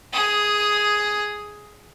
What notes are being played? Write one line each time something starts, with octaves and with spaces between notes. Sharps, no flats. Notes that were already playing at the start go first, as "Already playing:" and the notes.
G#4 D#6